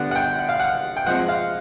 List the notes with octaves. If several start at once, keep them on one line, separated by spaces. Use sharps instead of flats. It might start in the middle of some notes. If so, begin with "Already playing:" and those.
Already playing: D3 G3 B3 D5 F#5
F#5
G5
F#5
F5
F#5
G5
F3 G#3 C4 F#5
F5